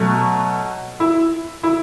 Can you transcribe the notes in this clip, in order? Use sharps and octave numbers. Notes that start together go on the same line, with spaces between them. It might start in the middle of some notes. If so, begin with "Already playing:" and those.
Already playing: B2 F#3 A3
E4
E4